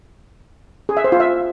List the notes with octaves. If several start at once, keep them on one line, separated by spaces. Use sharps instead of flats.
G#4
E5
C5
F4
E5